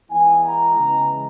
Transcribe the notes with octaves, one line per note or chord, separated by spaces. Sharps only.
E3 G#3 B3 E4 G#5
A#5
C#3 E3 G#3